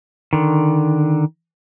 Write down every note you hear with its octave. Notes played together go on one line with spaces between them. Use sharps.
D3 D#3